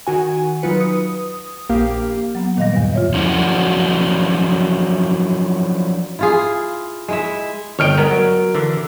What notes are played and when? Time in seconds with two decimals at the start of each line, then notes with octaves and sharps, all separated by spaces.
0.07 D#3 F#4 G#5
0.62 F#3 D#4 F4 B4 C#7
0.80 D#6
1.69 A#1 A#3 G4 F5
2.35 F#3 A#3 B3
2.57 A#2 D#3 G3 D#5 F5 A#6
2.73 E2 G2 B2
2.93 F4 C#5 E5
3.14 F3 F#3 C#4 D4 E4 F#4
6.19 E4 F4 G#4
7.08 G#3 E4 E5
7.79 G1 C#5 D#5 G5 F6 D7
7.98 G#3 B3 A#4
8.11 F#3
8.55 D3 E3 D4